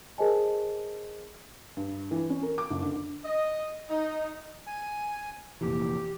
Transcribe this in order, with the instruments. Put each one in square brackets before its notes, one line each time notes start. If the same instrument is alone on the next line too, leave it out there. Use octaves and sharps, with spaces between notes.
[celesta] G#4 A#4 C5 D#5 G#5 A5
[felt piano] G2
E3
C#4
A#4
D6
F#1
D3
[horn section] D#5
D#4
[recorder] G#5
[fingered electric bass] F1 A#2 E3 [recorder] G4